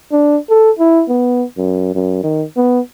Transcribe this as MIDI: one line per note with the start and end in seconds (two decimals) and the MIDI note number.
0.12 0.37 62
0.50 0.71 69
0.79 1.04 64
1.09 1.44 59
1.57 1.91 42
1.95 2.20 42
2.23 2.44 51
2.57 2.80 59